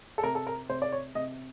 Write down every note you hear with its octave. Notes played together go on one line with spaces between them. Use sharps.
A4
C3 A#4
A4
A#4
C3 C5
D5
C#5
C3 D#5